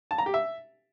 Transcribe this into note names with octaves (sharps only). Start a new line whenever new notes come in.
A5
A#5
G4
E5